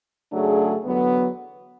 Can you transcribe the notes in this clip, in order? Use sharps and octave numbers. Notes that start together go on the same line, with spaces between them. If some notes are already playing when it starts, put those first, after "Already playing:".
C#3 F#3 A3 D4 G#4
E2 D3 F#3 B3